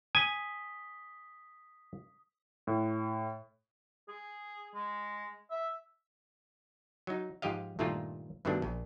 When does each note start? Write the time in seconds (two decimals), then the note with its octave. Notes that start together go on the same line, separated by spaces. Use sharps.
0.15 G#5 D#6 B6 G7
2.67 A2
4.08 G#4
4.74 G#3
5.51 E5
7.07 F#3 D#4
7.42 G#2 F3 G4 D#5 F5
7.79 G2 A#2 D#3 A3 A#3 F4
8.45 G2 B2 D#3 A3 D4
8.62 A#1